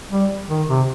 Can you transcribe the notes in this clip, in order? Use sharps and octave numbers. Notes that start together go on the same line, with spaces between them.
G3
D#3
C3